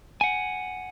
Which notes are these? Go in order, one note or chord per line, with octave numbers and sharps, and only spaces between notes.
F#5 G#5